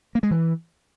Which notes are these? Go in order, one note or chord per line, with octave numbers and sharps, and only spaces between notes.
A#3
G#3
E3